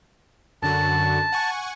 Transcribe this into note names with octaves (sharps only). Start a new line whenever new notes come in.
F#2 D3 F#4 A5
F#5 G#5 C#6